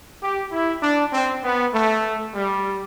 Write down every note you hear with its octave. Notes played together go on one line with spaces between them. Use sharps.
G4
E4
D4
C4
B3
A3
G3